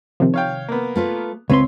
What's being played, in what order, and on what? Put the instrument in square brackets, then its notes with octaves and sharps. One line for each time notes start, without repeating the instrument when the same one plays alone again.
[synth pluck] C3 D#3 F3
[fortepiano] C#5 F5 G5
A#3 B3
[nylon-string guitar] A3 F4 B4
[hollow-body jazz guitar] C#2 C4 C6 [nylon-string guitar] B4 [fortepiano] C#5